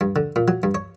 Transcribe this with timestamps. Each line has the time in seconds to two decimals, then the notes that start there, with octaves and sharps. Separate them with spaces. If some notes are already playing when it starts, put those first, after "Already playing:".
0.01 G2
0.16 D3
0.36 A#2
0.48 F#3
0.63 G2
0.75 C#5